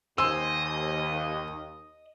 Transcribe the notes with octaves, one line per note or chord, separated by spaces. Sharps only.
D#2 C5 D#5 G#5 C6 E6